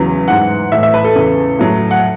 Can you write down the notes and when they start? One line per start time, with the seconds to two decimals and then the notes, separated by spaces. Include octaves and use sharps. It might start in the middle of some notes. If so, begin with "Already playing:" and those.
Already playing: E2 C#3 F#3
0.28 G#2 E3 F#5
0.72 A2 E3 E5
0.83 E5
0.94 B4
1.04 A4
1.15 E2 C#3 E3
1.59 A2 F#3
1.91 F#5